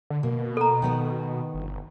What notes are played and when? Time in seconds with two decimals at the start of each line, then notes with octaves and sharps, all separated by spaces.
0.10 D3
0.23 B2 A#3
0.57 A4 A#5
0.82 D#3 B3 B4
1.54 G1